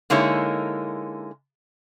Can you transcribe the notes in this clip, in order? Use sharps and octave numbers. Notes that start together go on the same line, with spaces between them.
D3 G#3 A#3 D#4 E4 C#5